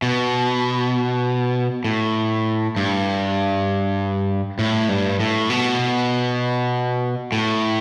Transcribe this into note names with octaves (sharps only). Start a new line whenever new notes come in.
B2
A2
G2
A2
G2
A2
B2
A2